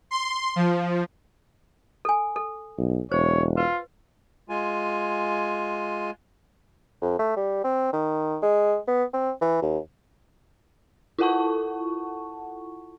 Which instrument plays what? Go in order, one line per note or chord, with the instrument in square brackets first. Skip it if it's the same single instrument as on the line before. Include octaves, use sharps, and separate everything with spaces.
[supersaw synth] C6
F3
[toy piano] A4 G#5
A4
[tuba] B1
[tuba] E1 [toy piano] C5 [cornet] C#5
[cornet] F4 [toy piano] B4
[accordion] G#3 F4 G#5
[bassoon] F2
A3
G3
C4
D#3
G#3
B3
C4
E3
D#2
[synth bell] E4 F4 A4 F#5 A5 C#6